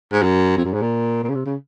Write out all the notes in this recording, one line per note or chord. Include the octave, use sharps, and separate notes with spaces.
G#2
F#2
F2
F#2
G#2
A#2
A#2
C#3
C3
C#3